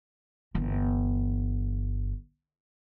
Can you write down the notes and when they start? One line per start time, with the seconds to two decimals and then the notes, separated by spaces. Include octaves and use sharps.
0.55 G1 E3